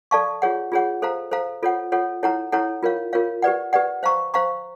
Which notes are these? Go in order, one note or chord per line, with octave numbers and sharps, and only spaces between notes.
A4 D5 F5 A5 C#6
F4 G#4 C#5 F#5
F4 G#4 C#5 F#5
A4 C5 F5 A#5
A4 C5 F5 A#5
F4 A4 C#5 F#5
F4 A4 C#5 F#5
E4 A4 C#5 F#5 A#5
E4 A4 C#5 F#5 A#5
F4 A#4 C#5 F5
F4 A#4 C#5 F5
G4 B4 D5 F#5
G4 B4 D5 F#5
C5 F5 A#5 C#6
C5 F5 A#5 C#6